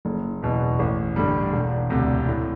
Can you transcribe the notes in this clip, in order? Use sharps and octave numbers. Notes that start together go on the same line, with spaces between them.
F#1
E2 B2
A1
G2 D3 G3
E1
D2 C3
A2